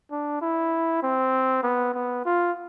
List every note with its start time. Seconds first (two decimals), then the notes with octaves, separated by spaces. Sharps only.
0.12 D4
0.42 E4
1.03 C4
1.63 B3
1.94 B3
2.26 F4